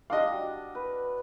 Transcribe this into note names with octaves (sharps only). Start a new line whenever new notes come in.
G3 D4 D#5 F5 D6
F#4
B4